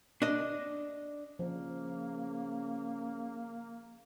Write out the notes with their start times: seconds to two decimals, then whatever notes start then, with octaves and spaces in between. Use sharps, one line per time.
0.22 D4 D#5
1.39 C#3 F3 A#3